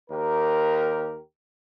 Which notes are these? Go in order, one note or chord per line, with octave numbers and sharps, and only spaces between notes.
D#2 G4 A#4